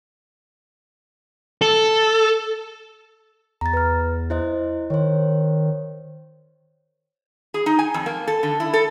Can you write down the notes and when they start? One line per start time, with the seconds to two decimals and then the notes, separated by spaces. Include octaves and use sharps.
1.62 A4
3.61 E2 A#5 A6
3.73 B4 F6
4.30 E4 C5 D#5
4.90 D#3 C5 C#5
7.54 G#4
7.66 D#4
7.79 G#5
7.94 F2
8.06 A#3
8.27 A4
8.43 D3
8.60 E4
8.73 A4